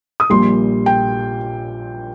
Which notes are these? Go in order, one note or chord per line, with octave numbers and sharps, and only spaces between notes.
D#6
A#1 A#2 G3 C6
G5